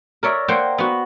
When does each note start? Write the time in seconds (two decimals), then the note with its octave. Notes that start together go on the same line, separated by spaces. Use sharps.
0.23 A#4 C#5 D5 E5
0.48 A#3 C5 F#5 G5
0.78 B3 F#4